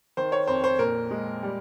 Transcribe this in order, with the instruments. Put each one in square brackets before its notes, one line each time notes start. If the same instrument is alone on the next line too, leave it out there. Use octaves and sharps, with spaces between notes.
[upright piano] D#3 C5
C#5
F2 C5
C5
A#2 A#4
G#3
G3